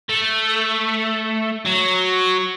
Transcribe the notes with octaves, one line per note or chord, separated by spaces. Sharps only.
A3
F#3